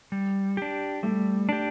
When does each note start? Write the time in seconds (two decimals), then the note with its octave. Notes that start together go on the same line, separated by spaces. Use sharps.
0.12 G3
0.57 D4 G4
1.03 G3 A3
1.49 D4 G4